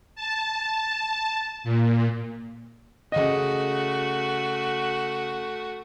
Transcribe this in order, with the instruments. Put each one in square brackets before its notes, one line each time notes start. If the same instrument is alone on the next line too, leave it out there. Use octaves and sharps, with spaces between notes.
[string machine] A5
A#2
[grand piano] C#3 D#5 [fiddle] A3 F#4